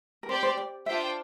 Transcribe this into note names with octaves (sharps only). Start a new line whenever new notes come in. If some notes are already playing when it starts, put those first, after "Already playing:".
A#4
C4 G4 C5 D5 G5
C5
D5
D4 F4 C5 E5 G5